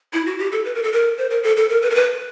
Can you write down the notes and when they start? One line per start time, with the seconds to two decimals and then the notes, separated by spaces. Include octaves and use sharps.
0.13 E4
0.26 F#4
0.39 G4
0.52 A4
0.65 B4
0.75 A#4
0.83 A4
0.92 A#4
1.18 C5
1.30 A#4
1.43 A4
1.57 A4
1.70 A#4
1.82 B4
1.90 A#4
1.95 B4